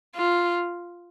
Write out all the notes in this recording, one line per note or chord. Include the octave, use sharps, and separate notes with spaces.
F4